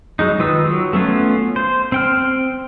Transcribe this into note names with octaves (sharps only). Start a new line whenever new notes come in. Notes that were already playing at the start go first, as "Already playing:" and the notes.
F#3 G#3 D#4
D#3 F4 B4 D#6 E6
F#3
A3 B3 C#4 F4
C5
C4 G5 F6